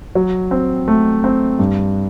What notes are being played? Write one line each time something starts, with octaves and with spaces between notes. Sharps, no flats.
F#3
C4
A3
C4
G2